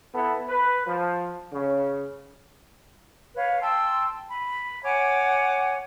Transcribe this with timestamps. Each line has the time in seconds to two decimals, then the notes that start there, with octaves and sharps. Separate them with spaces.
0.14 B3 E4 A4
0.48 B4
0.87 F3
1.53 C#3
3.35 B4 C#5 F5
3.60 G5 A5 C6 E6
4.30 B5
4.83 C#5 F#5 G#5 D6